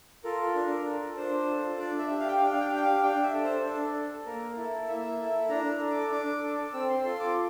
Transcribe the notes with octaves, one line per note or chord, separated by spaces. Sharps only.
F4 A4 A#4
D4 A#4
F4 A4
D4 C5
F4 A4
D4 D5
E5
G4
F5
G5
F5
D4 G5
F5
G5
F5
G4 G5
F5
D4 G5
E5
A4
C5
D4 A4
A4
A#3 A#4
E4 A4
A#3 E5
E4 A4
D4 A#5
A4
D6
D4 D6
A4
C4 E6
C6
F4 A4 C6
D6